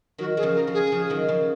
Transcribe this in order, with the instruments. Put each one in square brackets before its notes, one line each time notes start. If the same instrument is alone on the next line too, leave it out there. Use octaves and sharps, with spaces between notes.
[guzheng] D#3 F#3 [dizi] F#4
[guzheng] F#3 [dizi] G#4
[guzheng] C#3 F3
[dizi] A#4
[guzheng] C#3 F3
[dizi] G#4
[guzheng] C#3 F3
D#3 F#3
C#3 F3